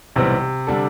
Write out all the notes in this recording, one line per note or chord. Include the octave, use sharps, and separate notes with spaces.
B1 A2 C3 E3 G3 C4
D3 G3 D4 A4